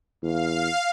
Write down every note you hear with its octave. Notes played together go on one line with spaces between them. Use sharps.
E2 F5